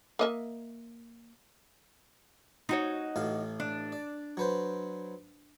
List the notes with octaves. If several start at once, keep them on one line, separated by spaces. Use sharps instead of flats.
A#3 D#5 E5
D#4 F#4 C#5
A1 A2 F5
D4
D5
F#3 B4 C5